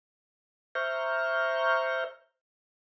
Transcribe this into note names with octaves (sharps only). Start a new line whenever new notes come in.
C5 E5 A#5 C#6 F6 G6